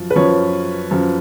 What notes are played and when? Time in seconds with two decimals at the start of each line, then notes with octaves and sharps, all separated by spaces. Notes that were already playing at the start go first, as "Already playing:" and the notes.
Already playing: F#2 F3
0.10 B4
0.16 F#2 F3 C#5
0.91 F#2 F3